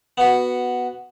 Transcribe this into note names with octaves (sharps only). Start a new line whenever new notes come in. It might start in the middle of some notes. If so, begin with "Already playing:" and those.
B3 F#4